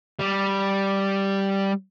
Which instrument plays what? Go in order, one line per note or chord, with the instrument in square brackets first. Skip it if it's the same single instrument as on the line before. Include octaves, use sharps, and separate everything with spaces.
[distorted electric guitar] G3